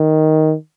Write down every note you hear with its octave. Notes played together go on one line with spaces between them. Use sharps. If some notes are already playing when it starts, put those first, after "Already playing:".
Already playing: D#3